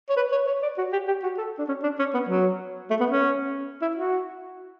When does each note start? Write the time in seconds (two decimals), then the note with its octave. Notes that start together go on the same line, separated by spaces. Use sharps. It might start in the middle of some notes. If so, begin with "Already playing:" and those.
0.09 C#5
0.16 B4
0.32 C#5
0.47 C#5
0.63 D5
0.78 F#4
0.93 G4
1.08 G4
1.23 F#4
1.38 A4
1.59 D4
1.68 C#4
1.83 D4
1.99 C#4
2.14 B3
2.29 F#3
2.90 A3
3.00 B3
3.10 C#4
3.82 E4
3.97 F#4